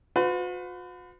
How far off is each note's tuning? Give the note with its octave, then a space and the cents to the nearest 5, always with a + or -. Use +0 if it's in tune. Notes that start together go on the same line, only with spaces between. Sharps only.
F#4 -45 B4 +40